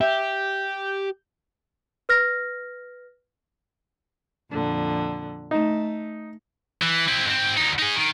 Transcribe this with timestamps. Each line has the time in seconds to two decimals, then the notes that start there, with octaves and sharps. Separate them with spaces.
0.01 G4 E5 G6
2.09 B4 F6 A#6
4.49 F2 A#2 D3
5.51 A3 D#4
6.82 E3
7.08 C4 E4
7.25 G#2 C4
7.57 D2 D#4
7.79 D#4 G#4
7.96 D#3